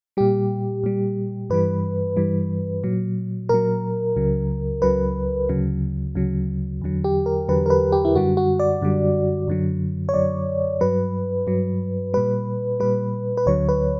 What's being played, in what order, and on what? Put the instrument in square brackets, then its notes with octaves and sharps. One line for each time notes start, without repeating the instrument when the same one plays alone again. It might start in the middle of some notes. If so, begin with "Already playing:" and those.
[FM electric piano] A#2 G3 G4
A#2 G3
G2 E3 G3 B4
G2 E3 G3
A#2 F#3
A#2 F#3 A#4
C#2 C#3 F#3
C#2 C#3 F#3 B4
D2 C#3 F#3
D2 C#3 F#3
E2 D3 F#3
G4
A#4
E2 D3 F#3 B4
A#4
B4
G4
E4
F#2 D3 G3 F#4
F#4
D5
F#2 D3 G3
F#2 D3 F#3
C#5
F#2 D3 F#3 D5
G2 F#3 B4
G2 F#3
A#2 G3 B4
A#2 G3 B4
B4
D2 D3 F#3 C#5
B4